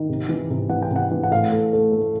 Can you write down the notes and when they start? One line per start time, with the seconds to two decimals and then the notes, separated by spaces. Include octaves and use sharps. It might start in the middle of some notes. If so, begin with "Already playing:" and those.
Already playing: D#3
0.09 C3
0.29 E3
0.50 C3
0.69 E3 F#5
0.82 G5
0.91 C3
0.96 F#5
1.11 E3
1.23 F#5
1.31 A2 F5
1.52 A3
1.73 A3
1.92 A3